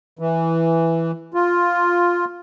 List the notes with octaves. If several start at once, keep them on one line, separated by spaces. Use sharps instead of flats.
E3
F4